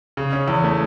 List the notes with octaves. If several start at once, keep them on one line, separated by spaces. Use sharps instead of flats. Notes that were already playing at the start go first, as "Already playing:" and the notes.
C#3
C#4
E2
A3